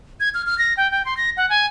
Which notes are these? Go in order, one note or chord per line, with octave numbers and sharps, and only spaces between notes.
G#6
F6
F6
A#6
G5
G5
C6
A#6
F#5
G#5